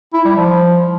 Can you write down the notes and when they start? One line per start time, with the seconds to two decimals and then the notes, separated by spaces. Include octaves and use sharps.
0.13 E4
0.25 G3
0.36 F3